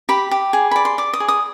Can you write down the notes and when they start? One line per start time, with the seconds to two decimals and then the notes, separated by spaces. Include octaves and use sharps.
0.09 G4 B5
0.31 G4
0.53 G#4
0.71 D5 B5
0.85 C6
0.98 D5 D6
1.13 D#6
1.20 G#4
1.28 D#6